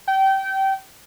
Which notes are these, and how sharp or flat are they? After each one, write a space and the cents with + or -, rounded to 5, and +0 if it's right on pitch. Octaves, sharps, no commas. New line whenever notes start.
G5 -25